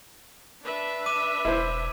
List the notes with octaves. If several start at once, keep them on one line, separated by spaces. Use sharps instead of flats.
D4 B4 E5
D6 D#7
E1 E4 C5